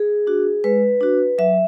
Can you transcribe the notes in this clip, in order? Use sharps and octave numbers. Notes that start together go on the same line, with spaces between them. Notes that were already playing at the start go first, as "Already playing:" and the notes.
Already playing: G#4
D4 F#4
G#3 B4
D4 F#4
F#3 E5